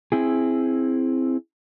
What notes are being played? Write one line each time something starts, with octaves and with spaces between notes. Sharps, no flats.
C4 E4 G#4